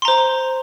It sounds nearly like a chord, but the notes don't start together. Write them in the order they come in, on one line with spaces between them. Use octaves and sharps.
C6 A#5 C5